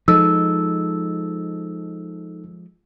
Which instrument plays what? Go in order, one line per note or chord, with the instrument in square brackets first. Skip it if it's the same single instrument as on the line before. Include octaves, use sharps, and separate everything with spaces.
[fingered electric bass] F3 G#3 [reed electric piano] D#4 A4 [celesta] E6